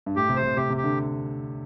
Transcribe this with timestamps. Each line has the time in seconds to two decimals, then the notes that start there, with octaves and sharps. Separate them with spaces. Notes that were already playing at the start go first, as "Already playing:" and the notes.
0.06 G2
0.16 A2 G4
0.29 C3
0.36 C5
0.43 C3
0.56 C3 G4
0.70 C3
0.77 G4
0.84 D3